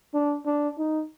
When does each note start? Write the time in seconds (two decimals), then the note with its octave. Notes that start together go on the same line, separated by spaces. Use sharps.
0.14 D4
0.46 D4
0.78 D#4